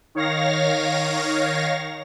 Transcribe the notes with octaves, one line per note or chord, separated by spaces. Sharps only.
D#3 C#5 F5 A#6